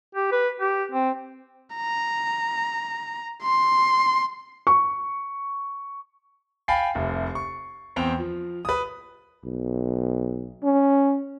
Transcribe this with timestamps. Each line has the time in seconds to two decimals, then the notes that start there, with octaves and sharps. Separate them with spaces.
0.15 G4
0.32 B4
0.60 G4
0.91 C4
1.75 A#5
3.43 C6
4.67 C#6
6.68 F5 G5 G#5 B5 A6 C7
6.95 F1 C2
7.35 C#6
7.96 E2 C4 G5 F7
8.19 F3
8.65 B4 D#6
9.44 B1
10.63 C#4